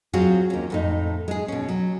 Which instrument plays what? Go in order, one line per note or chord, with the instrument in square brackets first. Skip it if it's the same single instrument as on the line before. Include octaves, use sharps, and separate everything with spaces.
[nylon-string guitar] F#3 C4 F4 F#4 G#4
D#2 C#4
F2 A2 D#4
G#3 G#4
B2 C#4
F#3